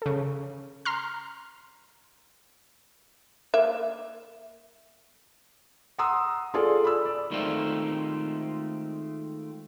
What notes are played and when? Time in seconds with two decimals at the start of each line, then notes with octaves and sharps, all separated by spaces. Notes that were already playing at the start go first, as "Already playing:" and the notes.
0.02 C#3 A4
0.85 A#5 C6 F6
3.54 A#3 E5
5.98 F#5 A#5 C6 D#6 E6
6.54 F4 G#4 A4 D5
6.85 B5 E6
7.05 D5
7.31 D#3 G#3 A3 C4 F4 A4